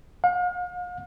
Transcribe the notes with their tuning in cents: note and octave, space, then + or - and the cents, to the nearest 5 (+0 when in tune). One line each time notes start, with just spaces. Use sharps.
F5 +40